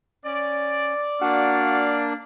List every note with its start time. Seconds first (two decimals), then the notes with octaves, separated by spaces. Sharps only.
0.25 C#4 D5
1.21 A#3 D4 F#4 F5